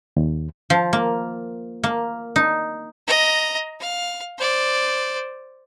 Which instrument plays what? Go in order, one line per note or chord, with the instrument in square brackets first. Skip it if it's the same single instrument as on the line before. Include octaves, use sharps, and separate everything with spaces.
[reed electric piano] D#2
[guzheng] F3
A#3
A#3
D#4
[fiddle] D#5 A#5
F5
C5 D5